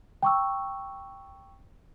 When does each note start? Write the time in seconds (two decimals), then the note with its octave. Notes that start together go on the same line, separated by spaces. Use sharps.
0.23 G5 A#5 C#6 D6 E6